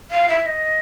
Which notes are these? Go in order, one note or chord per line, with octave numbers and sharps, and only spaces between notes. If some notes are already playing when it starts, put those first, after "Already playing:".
F5
E5
D#5